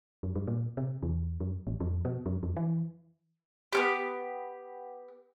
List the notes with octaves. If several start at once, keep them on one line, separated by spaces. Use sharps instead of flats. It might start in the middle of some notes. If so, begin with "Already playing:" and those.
F#2
G2
A#2
C3
E2
F#2
A1
F2
B2
F#2
F2
E3
B3 C#4 G4